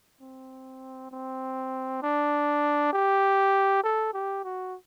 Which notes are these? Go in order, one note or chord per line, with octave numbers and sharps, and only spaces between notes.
C4
C4
D4
G4
A4
G4
F#4